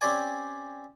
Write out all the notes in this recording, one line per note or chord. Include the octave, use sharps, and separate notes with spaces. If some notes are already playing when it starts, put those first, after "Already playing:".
C4 C#4 G4 C5 D5 G#5